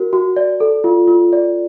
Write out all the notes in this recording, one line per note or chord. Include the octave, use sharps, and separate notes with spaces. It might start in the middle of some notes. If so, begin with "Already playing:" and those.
Already playing: F#4 A#4
F#4
D5
A4
F4
F4
D5